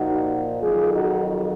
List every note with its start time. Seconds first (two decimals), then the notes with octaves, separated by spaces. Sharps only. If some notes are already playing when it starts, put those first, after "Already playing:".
Already playing: A#2 F3 D#4 F#4
0.61 F2 D#3 F#3 F4 G#4
0.93 D#4 F#4